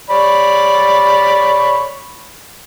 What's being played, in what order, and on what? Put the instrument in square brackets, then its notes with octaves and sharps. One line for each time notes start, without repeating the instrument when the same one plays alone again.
[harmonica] C#5 D5 B5